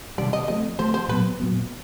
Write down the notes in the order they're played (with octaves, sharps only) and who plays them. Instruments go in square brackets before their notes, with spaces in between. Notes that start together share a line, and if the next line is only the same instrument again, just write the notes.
[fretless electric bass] C3 D#3 G3 [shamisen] D5
[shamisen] D#5
[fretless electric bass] F3 A3 C4 [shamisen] D#5
[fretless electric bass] F3 A3 C4 [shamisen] C5
[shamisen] C5
[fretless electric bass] A#2 F#3 B3 [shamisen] B4
[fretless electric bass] A#2 F#3 B3